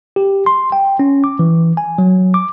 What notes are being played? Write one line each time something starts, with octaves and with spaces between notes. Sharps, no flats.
G4
C6
G5
C#4
D6
E3
G#5
F#3
D6